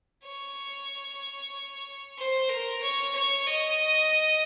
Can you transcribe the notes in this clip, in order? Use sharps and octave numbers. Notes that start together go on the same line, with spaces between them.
C#5
C5
A#4
C#5
C#5
D#5